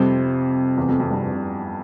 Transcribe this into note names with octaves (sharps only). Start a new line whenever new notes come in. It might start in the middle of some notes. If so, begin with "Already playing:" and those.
Already playing: F2 C3 G3 C4
E2
F2
F2
G2